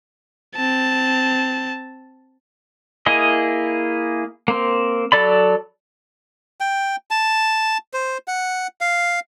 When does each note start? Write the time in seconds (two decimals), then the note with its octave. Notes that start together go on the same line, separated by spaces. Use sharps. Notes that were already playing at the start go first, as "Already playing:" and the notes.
0.55 C4 A5
3.06 A#3 E4 G#4 D#5
4.48 A#3 C4
5.12 F#3 A4 D5 B5
6.60 G5
7.11 A5
7.93 C5
8.28 F#5
8.81 F5